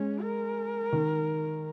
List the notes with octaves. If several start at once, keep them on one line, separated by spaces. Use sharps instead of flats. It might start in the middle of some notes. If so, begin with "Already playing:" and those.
Already playing: G#3 C#4
A#4
D#3